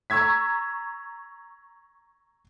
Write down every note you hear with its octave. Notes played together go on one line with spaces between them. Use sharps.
A#5 C#6 E6 G#6 B6